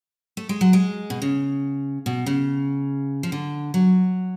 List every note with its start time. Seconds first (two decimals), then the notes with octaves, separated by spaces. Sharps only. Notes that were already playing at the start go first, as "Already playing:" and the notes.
0.37 A3
0.49 G#3
0.61 F#3
0.73 G#3
1.10 B2
1.22 C#3
2.06 B2
2.26 C#3
3.23 F3
3.32 D3
3.74 F#3